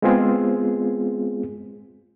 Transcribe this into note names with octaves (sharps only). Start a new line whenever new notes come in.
G#3 B3 C4 F4 G#4